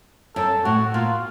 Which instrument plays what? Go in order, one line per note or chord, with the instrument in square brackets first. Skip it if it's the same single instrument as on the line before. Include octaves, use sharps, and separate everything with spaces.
[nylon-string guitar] F#2 [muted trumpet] A4
[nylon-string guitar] A2 [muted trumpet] F#4
[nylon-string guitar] A#2 [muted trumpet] F4